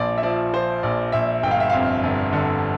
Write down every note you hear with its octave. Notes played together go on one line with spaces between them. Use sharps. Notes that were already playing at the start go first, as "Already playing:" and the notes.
Already playing: A#1 F3 F4 D5
E5
F3 D5
F3 C5
A#1 D5
A#1 E5
G1 G5
F5
E5
F2 F5
G1
D3